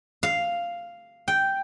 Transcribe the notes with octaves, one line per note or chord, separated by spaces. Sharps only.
F5
G5